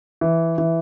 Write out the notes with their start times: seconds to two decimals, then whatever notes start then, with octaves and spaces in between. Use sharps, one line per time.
0.21 E3
0.58 E3